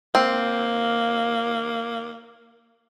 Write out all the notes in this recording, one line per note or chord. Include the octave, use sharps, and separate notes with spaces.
A#3 C4